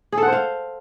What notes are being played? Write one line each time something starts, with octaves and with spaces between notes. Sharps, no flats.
G#4
A4
F#5
C5
F5